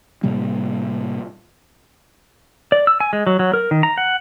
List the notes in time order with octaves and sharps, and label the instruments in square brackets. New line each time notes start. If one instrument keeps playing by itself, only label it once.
[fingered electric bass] A2 C3 G3 A#3
[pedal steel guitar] D5
E6
G#5
G#3
F#3
F#3
A#4
D#3
A#5
F#5